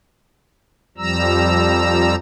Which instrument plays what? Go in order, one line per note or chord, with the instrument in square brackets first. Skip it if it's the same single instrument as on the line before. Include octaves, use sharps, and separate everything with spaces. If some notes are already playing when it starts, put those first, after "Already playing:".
[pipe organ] F2 F3 G3 A#5 E6